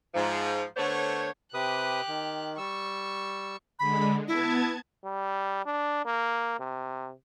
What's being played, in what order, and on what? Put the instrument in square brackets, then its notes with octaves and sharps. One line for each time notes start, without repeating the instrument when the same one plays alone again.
[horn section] G#2 F3
D3 A3 B3 C5 C#5
[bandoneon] C3 B4 D#6 [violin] G4 F#6
[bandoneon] D#3
[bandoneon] G3 E6 [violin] C#6
[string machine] D3 G#3 [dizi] B5
[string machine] B3 A5 G#6 [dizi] E4
[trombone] G3
D4
A#3
C3